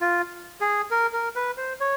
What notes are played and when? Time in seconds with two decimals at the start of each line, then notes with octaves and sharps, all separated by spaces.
0.01 F4
0.61 G#4
0.91 A#4
1.13 A#4
1.36 B4
1.57 C5
1.80 C#5